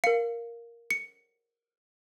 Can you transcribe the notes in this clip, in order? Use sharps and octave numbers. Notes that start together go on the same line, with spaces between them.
A#4 F5 C#7
C#7